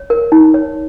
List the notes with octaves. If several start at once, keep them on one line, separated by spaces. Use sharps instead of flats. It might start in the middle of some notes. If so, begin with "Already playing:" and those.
Already playing: C#5
A#4
D#4
C#5